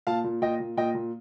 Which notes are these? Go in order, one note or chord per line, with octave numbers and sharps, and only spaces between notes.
A#2 F5 A5
A#2
A#2 D#5 G5
A#2
A#2 D#5 G5
A#2